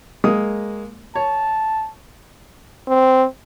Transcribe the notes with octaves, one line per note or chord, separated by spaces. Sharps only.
G#3 A#3 D#6
C#5 A5
C4